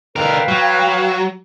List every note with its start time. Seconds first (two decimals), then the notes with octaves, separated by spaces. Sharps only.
0.16 D3 A#4 B4 F5 G5
0.48 F#3